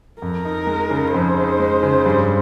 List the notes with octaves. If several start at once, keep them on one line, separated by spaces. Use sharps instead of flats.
F2 A#4
D#4
G#3
C#3
F2 C5
D#4
G#3
C#3
G2